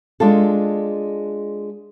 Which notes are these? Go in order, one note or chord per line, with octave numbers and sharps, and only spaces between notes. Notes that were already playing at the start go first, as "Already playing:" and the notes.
G#3 D4 F4 A4